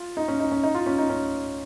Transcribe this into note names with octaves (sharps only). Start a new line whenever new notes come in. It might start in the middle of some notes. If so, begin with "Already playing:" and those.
Already playing: F4
D#4
C#4
D#4
C#4
D#4
F4
C#4
D#4
C#4